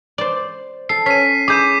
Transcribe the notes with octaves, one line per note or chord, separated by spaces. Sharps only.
C5 D5
A4 C7
C#4 B6 D#7
E4 G#4 D6 G6 D#7